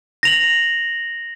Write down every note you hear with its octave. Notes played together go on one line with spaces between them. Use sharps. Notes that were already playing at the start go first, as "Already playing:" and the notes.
A#6 F7 F#7